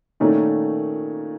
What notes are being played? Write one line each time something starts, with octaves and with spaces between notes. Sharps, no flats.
A#2 D#3 A3 C#4 D#4